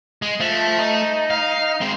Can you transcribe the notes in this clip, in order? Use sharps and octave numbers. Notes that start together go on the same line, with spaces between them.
G#3
F3 A3
D#4
F5
G#3 C4